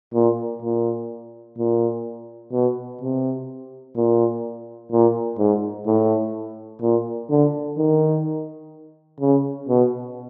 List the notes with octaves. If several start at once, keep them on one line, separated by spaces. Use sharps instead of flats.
A#2
A#2
A#2
B2
C3
A#2
A#2
G#2
A2
A#2
D3
D#3
C#3
B2